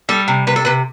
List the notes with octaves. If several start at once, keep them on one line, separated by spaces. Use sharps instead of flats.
G3 A4
C3
C3 B4
A4
C3 B4